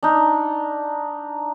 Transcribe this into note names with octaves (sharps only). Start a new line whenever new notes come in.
D4 D#4